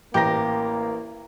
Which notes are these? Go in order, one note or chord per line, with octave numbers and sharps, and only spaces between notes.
A1 A#3 G4 A#5 A#6